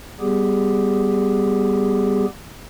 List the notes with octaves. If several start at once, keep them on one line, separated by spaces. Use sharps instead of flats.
G3 B3 G4 G#4